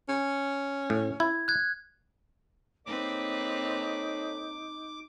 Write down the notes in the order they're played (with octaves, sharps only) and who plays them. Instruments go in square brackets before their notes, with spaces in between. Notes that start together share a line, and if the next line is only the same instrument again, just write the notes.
[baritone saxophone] C#4
[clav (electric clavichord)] A2
[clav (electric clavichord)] E4 [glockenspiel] G#6
[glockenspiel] F#6 G#6
[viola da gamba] A#3 C4 B4 [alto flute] D#4 [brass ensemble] A4 C#5 [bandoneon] D6